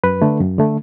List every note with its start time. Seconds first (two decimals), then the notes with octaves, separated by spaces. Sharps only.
0.04 F#2 B4
0.22 D3 A3
0.40 F#2
0.58 D3 A3